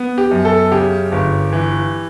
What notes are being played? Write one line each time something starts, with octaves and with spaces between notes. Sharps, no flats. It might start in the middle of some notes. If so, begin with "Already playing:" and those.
Already playing: B3
G4
F#2
A4
C#3 G4
G1
E3